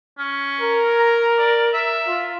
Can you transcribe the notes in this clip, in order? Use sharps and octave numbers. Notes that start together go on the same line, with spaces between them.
C#4
A#4
A#5
D5
E5
F4